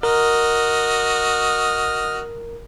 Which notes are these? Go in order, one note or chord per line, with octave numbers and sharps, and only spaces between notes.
F#4 A#4 D#5 F6